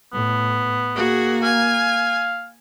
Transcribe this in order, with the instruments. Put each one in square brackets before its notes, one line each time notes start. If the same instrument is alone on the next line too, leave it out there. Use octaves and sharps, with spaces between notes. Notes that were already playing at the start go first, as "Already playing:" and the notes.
[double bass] A2 [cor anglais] B3
[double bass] A#3 [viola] F#4 G#4
[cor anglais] F5 [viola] G#5